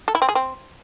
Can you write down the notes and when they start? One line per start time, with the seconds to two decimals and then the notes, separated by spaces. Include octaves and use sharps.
0.08 A4
0.15 E4
0.22 C4
0.29 G#4
0.35 C4